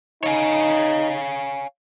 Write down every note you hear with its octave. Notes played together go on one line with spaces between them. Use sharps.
D#4 C#5 F5 G#5